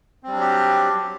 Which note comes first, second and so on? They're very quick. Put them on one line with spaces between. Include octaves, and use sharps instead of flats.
C4 G3 D4 F#3 G4